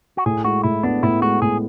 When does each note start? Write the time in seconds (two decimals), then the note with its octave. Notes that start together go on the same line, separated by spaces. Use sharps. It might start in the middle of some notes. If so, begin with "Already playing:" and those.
0.17 F#4
0.26 A2 G#4
0.44 G#3 F#4
0.63 A2 E4
0.83 B3 D4
1.03 A2 E4
1.22 G#3 F#4
1.42 A2 G#4